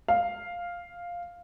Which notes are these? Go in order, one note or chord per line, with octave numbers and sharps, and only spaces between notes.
F5